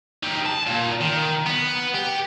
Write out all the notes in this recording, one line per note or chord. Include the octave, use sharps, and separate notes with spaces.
D#4 G4
A5
A#2
D#3
B3
G4